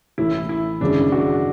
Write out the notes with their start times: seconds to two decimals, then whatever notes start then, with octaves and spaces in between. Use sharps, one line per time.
0.18 A1 A2 E3 E4
0.49 E4
0.81 G#1 F#2 C#3 G#3 C#4 D4
1.12 F#4